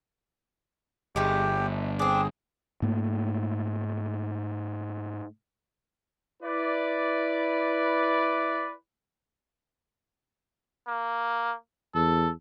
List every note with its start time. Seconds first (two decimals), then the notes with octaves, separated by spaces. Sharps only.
1.16 G1 G#3 A3 G4
1.99 C4 D4 G#4
2.82 G#2 A3 A#3
6.42 E4 B4 D5
10.87 A#3
11.95 E2 A4